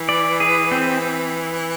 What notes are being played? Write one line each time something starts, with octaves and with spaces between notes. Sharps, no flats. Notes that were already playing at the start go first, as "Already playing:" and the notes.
Already playing: E3
D5
G#4
C4